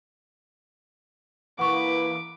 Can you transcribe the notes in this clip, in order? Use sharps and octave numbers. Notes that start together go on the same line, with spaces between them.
E3 A#3 B4 F#5 C#6 D6